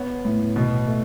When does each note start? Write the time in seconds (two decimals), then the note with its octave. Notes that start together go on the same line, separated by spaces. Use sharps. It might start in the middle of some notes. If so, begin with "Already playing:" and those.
Already playing: B3 C#5
0.25 A2
0.56 B2
0.88 A3